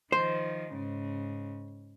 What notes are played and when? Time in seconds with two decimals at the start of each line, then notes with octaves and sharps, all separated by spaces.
0.12 D#3 F3 C5
0.74 G#2 C#3